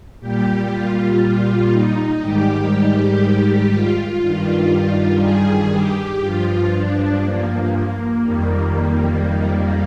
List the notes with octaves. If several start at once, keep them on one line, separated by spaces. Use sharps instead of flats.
A#2 G3 G4
F4
F4
D#4
G#2 D#3 G3 G4
F4
G2 D#3 G3
G#4
G4
G2 F3 F4
D4
A#3
A#3
F2 D#3 G3